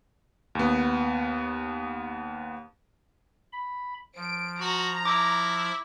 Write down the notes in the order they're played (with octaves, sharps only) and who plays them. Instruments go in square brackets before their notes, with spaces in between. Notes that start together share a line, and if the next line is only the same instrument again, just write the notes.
[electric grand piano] D#2 B3
[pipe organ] B5
[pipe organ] F3 [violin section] D7
[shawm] F#4 [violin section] A#5
[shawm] E4 [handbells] D6